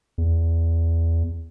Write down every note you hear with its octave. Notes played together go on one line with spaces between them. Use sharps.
E2